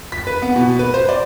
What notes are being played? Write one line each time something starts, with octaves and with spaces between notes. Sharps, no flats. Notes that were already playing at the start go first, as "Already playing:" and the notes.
B6
B4
B3
B2
B4
C5
D5